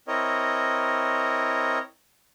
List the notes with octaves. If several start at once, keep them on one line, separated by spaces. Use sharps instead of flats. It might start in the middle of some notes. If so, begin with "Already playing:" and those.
C4 E4 A#4 C#5 D#5